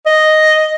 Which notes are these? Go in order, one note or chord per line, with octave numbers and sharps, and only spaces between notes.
D#5